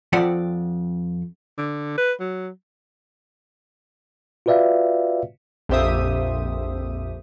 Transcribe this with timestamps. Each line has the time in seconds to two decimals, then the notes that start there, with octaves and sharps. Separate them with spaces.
0.13 F2 F3 C4 D5 F#5
1.58 D3
1.98 B4
2.20 F#3
4.46 F4 F#4 B4 D5 E5 F5
5.69 A#1 F2 G4 C5 E5 D#6